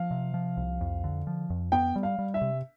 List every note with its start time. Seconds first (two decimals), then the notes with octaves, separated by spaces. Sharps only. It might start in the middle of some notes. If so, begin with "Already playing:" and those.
Already playing: F3 F5
0.11 C3
0.34 F3
0.57 C2
0.81 F2
1.04 D3
1.27 F3
1.50 F2
1.72 B3 G5
1.96 G3
2.03 F5
2.19 G3
2.34 E5
2.41 C3